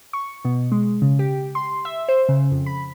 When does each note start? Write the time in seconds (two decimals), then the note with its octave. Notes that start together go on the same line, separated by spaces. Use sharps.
0.13 C#6
0.45 B2
0.72 G#3
1.02 C#3
1.19 G4
1.55 C6
1.85 E5
2.08 C5
2.29 C#3
2.51 F2
2.66 B5